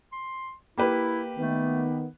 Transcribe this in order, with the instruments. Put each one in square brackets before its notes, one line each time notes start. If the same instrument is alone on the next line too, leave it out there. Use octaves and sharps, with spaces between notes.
[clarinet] C6
[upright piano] A#3 G4 B4 [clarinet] E4
[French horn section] D#3 B3 [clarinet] A3